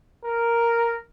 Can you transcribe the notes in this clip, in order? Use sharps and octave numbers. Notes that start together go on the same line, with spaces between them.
A#4